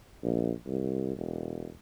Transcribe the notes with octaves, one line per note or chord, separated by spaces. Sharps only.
A#1
C2
E1